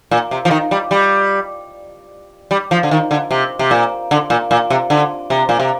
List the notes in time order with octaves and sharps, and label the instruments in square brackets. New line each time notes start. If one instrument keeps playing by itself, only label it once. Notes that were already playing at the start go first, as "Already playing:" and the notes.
[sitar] A#2
C3
F3
D#3
G3
G3
G3
F3
D3
D#3
D3
C3
C3
A#2
D3
A#2
A#2
C3
D3
C3
A#2
C3